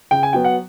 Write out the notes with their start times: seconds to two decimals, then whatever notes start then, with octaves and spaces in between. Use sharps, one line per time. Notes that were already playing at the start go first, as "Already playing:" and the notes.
0.11 C#3 G5
0.23 G#5
0.33 F#3 B3 G5
0.44 F#5